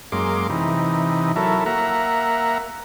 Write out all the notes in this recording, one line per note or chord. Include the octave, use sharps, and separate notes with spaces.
F#2 G#3 A#3 C6 D6
C3 E3 D#4
F#3 E4 A4 A#4
A#3 E5 F#5 A#5